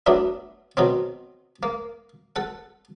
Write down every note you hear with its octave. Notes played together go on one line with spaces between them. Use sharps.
F#3 A3 B3 D4 E4
B2 F#3 B3 C4
A#3
A4 F#5